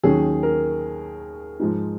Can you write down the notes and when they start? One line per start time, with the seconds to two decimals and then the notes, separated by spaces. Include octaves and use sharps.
0.03 D#2 D#3 F#3 C#4 G#4
0.43 A#4
1.60 G#2 F3 G#3 D#4